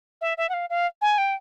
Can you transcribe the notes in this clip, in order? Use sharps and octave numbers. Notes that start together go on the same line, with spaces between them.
E5
E5
F#5
F5
F5
G#5
G5